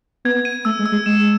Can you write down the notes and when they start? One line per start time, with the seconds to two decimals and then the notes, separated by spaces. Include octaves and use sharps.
0.25 B3 G#6
0.45 D#7
0.65 A3 E6
0.79 G#3
0.86 E6
0.92 G#3
1.06 G#3 E7